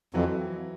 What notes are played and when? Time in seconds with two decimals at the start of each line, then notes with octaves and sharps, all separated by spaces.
0.14 F2 E3 F#3